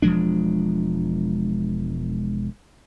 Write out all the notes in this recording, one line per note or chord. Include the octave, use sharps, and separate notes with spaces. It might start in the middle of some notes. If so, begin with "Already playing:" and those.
E1 F3 G#3 D4